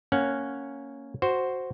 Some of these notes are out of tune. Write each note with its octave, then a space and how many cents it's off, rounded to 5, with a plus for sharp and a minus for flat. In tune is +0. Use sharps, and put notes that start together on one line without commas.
A#3 -10 C#4 +0 F#5 +0
F#4 +0 C5 +0